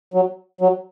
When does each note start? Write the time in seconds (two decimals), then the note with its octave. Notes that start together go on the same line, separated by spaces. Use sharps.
0.14 F#3
0.61 F#3